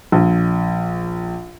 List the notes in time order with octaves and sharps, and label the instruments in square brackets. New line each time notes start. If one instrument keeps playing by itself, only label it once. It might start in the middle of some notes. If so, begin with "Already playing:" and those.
[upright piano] A#1